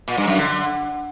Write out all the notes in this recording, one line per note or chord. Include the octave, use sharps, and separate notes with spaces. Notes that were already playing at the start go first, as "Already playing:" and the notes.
A#2
G2
F#2
D3